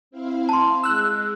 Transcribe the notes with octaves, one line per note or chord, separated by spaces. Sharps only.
C4 E4 F5
A5 C6
G#3 E6 F#6